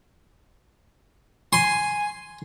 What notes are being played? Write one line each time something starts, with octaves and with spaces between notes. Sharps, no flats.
G#5 C6